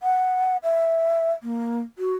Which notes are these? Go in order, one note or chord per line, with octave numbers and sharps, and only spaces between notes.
F#5
E5
A#3
F#4